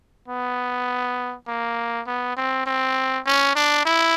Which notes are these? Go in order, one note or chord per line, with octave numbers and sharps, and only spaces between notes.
B3
A#3
B3
C4
C4
C#4
D4
E4